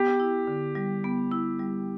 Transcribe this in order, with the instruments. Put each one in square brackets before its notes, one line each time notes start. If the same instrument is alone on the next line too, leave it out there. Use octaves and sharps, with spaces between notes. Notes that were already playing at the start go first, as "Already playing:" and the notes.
Already playing: [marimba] B3 [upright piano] G4
[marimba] E4
D3
G3
B3
E4
G3